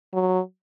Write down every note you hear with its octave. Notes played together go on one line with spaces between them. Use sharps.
F#3